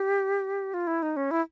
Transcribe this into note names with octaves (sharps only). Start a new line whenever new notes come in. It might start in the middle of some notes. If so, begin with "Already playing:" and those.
Already playing: G4
F4
E4
D#4
C#4
E4